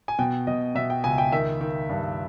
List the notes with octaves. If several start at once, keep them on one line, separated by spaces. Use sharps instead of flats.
G#5
B2 G5
B2 D#5
B2 E5
G5
C#2 G#5
G5
D#3 E5
D#3
G2